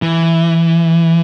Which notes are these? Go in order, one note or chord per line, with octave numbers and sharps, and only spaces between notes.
E3